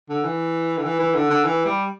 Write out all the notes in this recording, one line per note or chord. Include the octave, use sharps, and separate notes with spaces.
D3
E3
D3
E3
E3
D3
D3
E3
G3